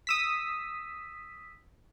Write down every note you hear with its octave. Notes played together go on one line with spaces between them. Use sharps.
D#6 E6 B6